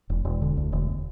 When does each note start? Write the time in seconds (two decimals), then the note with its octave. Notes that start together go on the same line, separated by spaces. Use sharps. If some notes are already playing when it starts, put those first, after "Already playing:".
0.10 E1
0.25 E1
0.42 D3
0.57 D2
0.73 E1